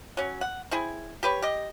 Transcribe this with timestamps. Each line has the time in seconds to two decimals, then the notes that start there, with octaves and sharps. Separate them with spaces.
0.17 F#3 C#4
0.41 F#5
0.71 C4 E4 G#4
1.23 G4 B4 C#5
1.42 G4 D#5